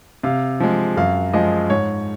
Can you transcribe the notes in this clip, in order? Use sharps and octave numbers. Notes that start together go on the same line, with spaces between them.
C3 F5
F3 G#3
F#2 F5
F3 G#3 D#5
G#2 C#5